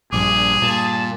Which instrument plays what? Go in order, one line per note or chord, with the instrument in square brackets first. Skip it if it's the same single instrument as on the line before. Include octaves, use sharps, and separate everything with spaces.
[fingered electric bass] A#1 [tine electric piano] G2 G3 D6 [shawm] G#4
[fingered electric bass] A#2 [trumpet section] A5